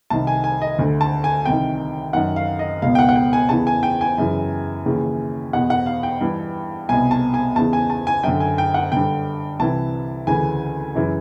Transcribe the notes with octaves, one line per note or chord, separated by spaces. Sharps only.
C2 C3 D#3 A5
G#5
G#5
D#5
D2 D3
A5
G#5
C2 C3 D#3 G5
F#2 D#3 F#5
F5
D#5
C#2 B2 F5
G5
F#5
F#5
G5
G#5
E2 C#3 E3 A5
G#5
G5
G#5
F#2 C#3 E3
D#2 C#3 E3
E2 B2 F#5
F#5
F5
G5
G2 E3
C2 B2 G#5
A5
G#5
E2 C#3 E3 A5
G#5
A5
G#5
F#2 D3 G5
G#5
G5
F#5
G2 D3 G5
C2 C3 E3 A5
D2 C#3 E3 G#5
F#2 C#3 E3